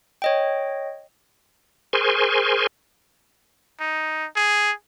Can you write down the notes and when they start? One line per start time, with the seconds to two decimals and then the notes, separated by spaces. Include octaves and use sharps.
0.22 C#5 D#5 G5
1.93 G#4 A#4 C5 G#5 C6 C#6
3.81 D#4
4.37 G#4